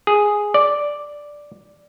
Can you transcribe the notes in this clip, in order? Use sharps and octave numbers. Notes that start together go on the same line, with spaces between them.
G#4
D5